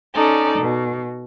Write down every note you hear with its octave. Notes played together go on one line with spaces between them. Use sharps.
C#4 D#4 A4 D5
B2